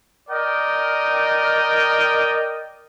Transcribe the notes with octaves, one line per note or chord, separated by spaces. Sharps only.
A#4 D5 D#5 G5